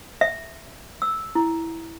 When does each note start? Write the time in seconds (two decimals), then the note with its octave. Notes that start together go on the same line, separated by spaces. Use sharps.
0.21 E5
1.02 E6
1.35 E4